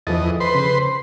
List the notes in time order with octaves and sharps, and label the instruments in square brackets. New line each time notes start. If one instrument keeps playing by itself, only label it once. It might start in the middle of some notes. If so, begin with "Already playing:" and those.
[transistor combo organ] E2 D#5 [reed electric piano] F3 A4 A6
[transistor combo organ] B4 C5 C6
[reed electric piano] C#3